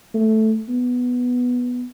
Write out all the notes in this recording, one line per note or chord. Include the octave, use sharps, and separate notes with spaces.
A3
B3